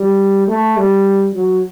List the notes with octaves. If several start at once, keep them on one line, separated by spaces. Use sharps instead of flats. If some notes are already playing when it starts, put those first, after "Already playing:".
Already playing: G3
A3
G3
F#3